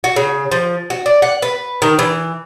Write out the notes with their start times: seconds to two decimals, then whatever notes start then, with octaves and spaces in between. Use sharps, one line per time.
0.04 F#4
0.16 C#3
0.52 F3
0.90 F#4
1.06 D5
1.22 F#5
1.42 B4
1.82 D#3
1.99 E3